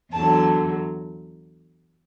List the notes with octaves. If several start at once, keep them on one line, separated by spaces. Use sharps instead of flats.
E2 D3 F#3 A5